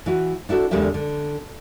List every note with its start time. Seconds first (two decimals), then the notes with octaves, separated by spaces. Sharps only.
0.06 E3 E4 F#4
0.49 D4 E4 F#4 A4
0.71 E2 D3 G#3 A#3 G4 E5
0.94 D3